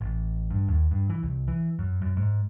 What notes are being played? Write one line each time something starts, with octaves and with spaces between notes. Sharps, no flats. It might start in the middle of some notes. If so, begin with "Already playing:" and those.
A1
G2
D#2
G2
E3
C2
E3
F#2
F#2
G#2